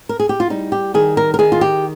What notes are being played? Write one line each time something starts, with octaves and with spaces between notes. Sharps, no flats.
A#4
G#4
G4
F4
G3 D#4
G4
D#3 G#4
A#4
A#4
D#3 G#4
F4
G4